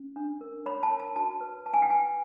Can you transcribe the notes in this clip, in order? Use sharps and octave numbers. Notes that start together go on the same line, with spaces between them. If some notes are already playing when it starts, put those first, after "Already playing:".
Already playing: C#4
D4
A#4
C#5 B5
A5
A#4
A5
F#4 A5
B4
B4 A5
G#5
G5
B4 G#5